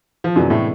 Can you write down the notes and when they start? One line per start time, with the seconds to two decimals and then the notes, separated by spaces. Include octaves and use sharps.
0.24 F3
0.36 F#2 C3 E3 F#3 G#3 B3 D4
0.50 A2 A3